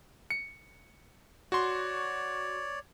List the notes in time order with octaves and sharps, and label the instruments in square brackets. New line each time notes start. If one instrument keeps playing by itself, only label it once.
[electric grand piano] C#7
[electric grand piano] F#4 C6 [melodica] C#5 D5